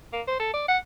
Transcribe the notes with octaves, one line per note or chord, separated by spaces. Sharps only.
A#3
C5
A4
D5
F#5